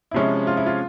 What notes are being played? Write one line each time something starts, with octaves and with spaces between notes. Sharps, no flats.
C3 F3 G#3 C#4 E4
F4
E4
F4